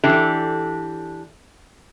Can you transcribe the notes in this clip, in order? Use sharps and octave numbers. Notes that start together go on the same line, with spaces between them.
E3 D4 G4 A4